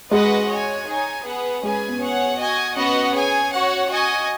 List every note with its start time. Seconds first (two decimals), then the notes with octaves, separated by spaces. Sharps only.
0.11 G#3 F#4 B4 D#5 F#5
0.49 F#4 C#5 G#5
0.87 D#4 G#4 C#5 G#5
1.25 B3 G#4 B4 F#5
1.63 G#3 C#4 G#4 B4 G#5
1.88 B3
2.01 G#4 C#5 F#5
2.38 F#4 D#5 G#5
2.76 B3 C#4 F#4 D#5 F#5
3.14 G#4 C#5 G#5
3.51 F#4 C#5 F#5
3.89 F#4 D#5 G#5